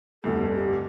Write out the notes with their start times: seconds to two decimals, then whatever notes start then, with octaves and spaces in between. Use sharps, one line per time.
0.24 F1 D2 G2 A4
0.55 G4